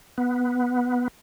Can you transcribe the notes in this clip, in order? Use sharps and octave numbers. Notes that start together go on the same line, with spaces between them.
B3